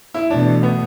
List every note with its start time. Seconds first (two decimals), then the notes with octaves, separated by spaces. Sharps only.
0.14 E4
0.30 E2 B2 A3 D4
0.63 B3